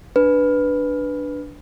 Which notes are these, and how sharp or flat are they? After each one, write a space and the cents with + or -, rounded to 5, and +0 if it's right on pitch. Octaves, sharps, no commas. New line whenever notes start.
D4 +0 B4 +0